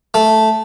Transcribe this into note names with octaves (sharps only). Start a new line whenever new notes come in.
A3